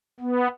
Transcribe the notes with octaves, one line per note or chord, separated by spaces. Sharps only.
B3